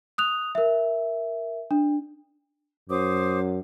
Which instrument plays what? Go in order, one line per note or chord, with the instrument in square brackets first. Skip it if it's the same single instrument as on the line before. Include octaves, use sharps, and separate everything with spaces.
[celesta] D#6 F#6 F7
A#4 E5
D4
[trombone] F#2 [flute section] C5 D6 D#6